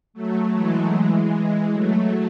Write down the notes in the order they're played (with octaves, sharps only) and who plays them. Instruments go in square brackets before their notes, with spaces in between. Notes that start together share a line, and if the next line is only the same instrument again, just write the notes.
[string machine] F#3 A3
E3 G#3
E3 G#3
F#3 A3